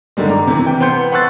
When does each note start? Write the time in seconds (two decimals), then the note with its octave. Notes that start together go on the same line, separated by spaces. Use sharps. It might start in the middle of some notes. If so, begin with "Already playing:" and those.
0.17 G2 D3 D#3 G3 G#3
0.29 A#5 D6
0.47 C3 E3
0.67 G5
0.80 B3 C5 C6 G6 C#7
1.12 F#5 C6 C#6 E6 F#6 A6